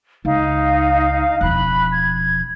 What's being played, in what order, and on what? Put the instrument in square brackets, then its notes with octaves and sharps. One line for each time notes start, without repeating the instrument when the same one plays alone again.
[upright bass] C#2 [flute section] D#4 F5
[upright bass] E1 F3 [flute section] B5 F#6
[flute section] G#6